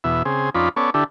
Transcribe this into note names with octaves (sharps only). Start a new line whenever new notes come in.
E2 B2 E5
C#3 C4 G#4
F2 C#4 D#4 F4 D5 B5
B3 C#4 A4 C#5 D5
D3 D4 E4 G4 A4